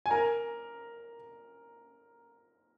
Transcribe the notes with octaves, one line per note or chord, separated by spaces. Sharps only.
G#5
A#4 A#5